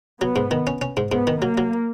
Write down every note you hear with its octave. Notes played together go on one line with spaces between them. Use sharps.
F#3 B3
G#2
D#3
C#4
C#4
G#2
G#2 B3
D#3
F#3 A#3
F#3